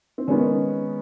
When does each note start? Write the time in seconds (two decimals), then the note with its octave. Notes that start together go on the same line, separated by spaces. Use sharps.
0.18 C4
0.28 D#3 G#3 B3 C#4